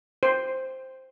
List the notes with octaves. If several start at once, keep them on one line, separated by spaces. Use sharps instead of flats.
C5